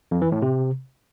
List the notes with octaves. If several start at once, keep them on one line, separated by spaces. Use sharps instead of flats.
F2
E3
A2
C3